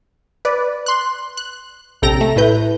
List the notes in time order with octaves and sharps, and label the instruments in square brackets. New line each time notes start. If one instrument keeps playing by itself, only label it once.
[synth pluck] B4 D5
C6 F#6
F#6
A#1 C3 A4 G5 A#5 A#6
A3
A2 A3 E4 B4 G6